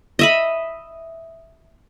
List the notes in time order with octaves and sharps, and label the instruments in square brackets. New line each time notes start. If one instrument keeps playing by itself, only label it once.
[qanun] D#5 E5 B5